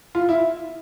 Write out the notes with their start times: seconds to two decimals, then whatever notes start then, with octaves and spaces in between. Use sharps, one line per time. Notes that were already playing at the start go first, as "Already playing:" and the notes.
0.15 F4
0.29 E4